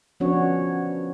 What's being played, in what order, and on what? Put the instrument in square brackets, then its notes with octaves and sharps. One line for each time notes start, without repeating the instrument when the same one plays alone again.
[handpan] F3 B3 C#4 D4 F#4 C#5